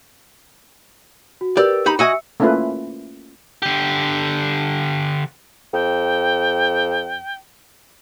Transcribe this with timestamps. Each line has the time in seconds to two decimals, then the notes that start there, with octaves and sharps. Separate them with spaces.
1.41 F#4
1.57 G4 A#4 B4 D5 E6
1.86 D#4 G4 B5
1.99 F#4 D#5 E5 G#5 E6 C#7
2.40 A3 A#3 C#4 E4 F4 B4
3.62 D3 G4
5.73 F2 G5